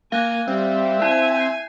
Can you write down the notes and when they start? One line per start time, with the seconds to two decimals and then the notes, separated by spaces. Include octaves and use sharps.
0.12 A#3 F5 G#5 F#6
0.47 G3 C4 E5
1.02 E4 G#5
1.36 G6 C7